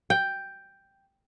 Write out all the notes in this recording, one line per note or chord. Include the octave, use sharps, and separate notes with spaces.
G5